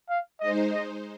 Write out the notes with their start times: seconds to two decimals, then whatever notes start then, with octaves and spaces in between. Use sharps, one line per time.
0.10 F5
0.41 G#3 D#4 C5 D#5
0.72 D#5